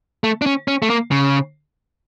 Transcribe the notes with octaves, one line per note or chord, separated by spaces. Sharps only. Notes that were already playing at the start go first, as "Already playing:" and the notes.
A3
D4
C#4
C#4
A3
A#3
C#3